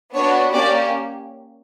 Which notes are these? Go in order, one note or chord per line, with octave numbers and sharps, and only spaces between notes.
B3 D4 F#4 C#5
A#3 C#4 G4 D5